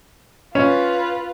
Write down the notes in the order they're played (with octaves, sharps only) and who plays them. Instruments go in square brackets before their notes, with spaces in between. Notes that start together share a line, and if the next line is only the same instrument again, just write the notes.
[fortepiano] C#4 [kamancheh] F4 B4